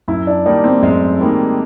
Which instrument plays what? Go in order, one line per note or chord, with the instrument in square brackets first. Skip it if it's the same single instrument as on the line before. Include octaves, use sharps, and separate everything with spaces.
[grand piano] F#2 [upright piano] E4
[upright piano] D4
[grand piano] D#3 G3 A#3 D#4 [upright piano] D4
[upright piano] C4
A3
[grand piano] F#2 [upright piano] G#3
[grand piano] D#3 G3 A#3 D#4